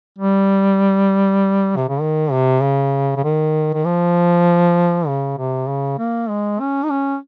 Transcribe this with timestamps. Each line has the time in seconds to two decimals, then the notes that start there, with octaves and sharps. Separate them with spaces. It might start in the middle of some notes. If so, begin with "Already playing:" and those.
0.18 G3
1.77 C3
1.89 C#3
2.01 D#3
2.32 C3
2.63 C#3
3.16 C#3
3.24 D#3
3.74 D#3
3.85 F3
5.07 C#3
5.38 C3
5.69 C#3
5.99 A#3
6.30 G#3
6.60 C#4
6.84 D#4
6.90 C#4